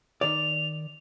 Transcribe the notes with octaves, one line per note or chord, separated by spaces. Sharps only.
D#3 D5 F7